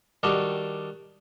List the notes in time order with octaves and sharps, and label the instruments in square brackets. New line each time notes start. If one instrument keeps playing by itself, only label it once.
[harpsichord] D#3 G3 D4 F#4 A4